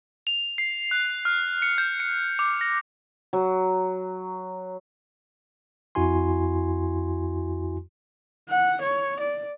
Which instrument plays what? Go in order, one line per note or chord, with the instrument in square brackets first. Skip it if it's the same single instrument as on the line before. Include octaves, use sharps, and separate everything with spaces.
[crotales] F7
C7
F#6
F6
C#7
G6
C#7
D6
A#6
[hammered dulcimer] F#3
[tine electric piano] F2 E4 F#4 G#5 C6
[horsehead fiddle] F#5
C#5
D5